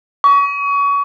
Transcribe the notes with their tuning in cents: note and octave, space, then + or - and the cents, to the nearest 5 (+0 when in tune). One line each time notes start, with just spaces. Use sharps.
C#6 +30